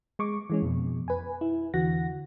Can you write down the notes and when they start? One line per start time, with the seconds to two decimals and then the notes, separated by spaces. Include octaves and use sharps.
0.19 G#3 C#6 D6
0.50 E3 G#3 C#4
0.62 F2 B2
1.08 B4 G#5
1.41 E4
1.74 E2 D3 E3 F#4 F#5 A#6